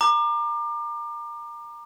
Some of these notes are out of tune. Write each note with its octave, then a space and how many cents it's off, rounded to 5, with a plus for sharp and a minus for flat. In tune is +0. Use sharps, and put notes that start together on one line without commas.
A#5 +0 D6 +35